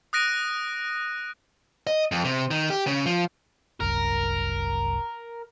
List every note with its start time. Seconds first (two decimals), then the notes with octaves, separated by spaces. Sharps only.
0.13 D#6 F#6 A#6 D7 D#7
1.87 D#5
2.12 F2
2.24 C3
2.51 D#3
2.70 G4
2.87 C#3
3.06 F3
3.80 F#1 C2 F#2 A#4